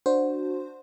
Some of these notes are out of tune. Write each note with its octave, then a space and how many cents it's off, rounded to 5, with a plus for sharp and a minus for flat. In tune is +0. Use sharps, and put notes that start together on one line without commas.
D4 +0 F#4 -15 C5 +0